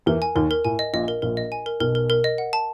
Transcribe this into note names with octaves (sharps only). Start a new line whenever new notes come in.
E2 E3 A#4
G#5
D#2 D#3 A#4
A#4
A2 G#5
D#5
A#1 A#2 D#5
A#4
A#1 A#2 A#4
D#5
G#5
A#4
B1 B2 A#4
A#4
A#4
D#5
F#5
A5